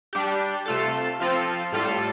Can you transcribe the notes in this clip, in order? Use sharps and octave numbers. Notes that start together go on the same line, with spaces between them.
G3 D4 G4
C3 A3 F4 A4
F3 C4 F4 A4
A2 G3 F4 A4